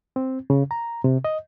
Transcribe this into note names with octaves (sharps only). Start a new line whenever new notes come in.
C4
C#3
A#5
C3
D#5